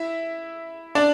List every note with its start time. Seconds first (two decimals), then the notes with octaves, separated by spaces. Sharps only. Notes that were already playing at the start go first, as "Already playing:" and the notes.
Already playing: E4 E5
0.95 D4 D5